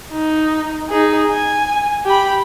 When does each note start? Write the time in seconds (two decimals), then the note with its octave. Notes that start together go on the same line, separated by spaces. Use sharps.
0.11 D#4
0.89 D#4 G#4
1.28 G#5
2.06 G4 B5